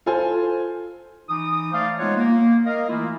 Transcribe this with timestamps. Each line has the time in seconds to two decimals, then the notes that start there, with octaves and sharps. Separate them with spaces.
0.06 F4 A4 C5 G#5
1.28 E3 D#4 D6 D#6
1.73 A3 C5 D5 F5
1.98 G#3 B3 D#4 F4 C#5 F#5
2.16 A#3
2.65 A#4 D#5 F5
2.88 E3 A3 A#3 E4 F4